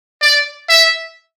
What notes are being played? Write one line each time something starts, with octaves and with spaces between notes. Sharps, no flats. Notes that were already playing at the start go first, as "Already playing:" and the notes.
D5
E5